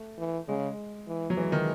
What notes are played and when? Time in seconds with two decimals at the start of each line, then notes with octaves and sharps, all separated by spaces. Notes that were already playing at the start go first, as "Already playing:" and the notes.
Already playing: A3
0.18 E3
0.48 C#3 G#3
1.07 E3
1.30 F#3
1.37 E3 G#3
1.52 D#3